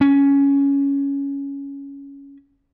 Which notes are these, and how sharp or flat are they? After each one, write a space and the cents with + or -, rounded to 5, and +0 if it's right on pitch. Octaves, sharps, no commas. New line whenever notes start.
C#4 +10